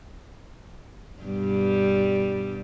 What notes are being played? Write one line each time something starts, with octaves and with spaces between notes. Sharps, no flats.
G2 B2 G3